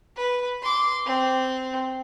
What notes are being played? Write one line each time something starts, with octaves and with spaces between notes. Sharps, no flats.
B4
C6 D6
C4